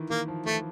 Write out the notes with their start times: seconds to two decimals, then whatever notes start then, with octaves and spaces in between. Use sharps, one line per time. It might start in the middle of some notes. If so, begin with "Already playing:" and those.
Already playing: D#3 E3
0.10 D#3 A#3
0.28 F3
0.46 E3 A3